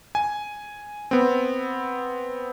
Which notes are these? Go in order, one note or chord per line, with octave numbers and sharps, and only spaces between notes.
G#5
B3 C4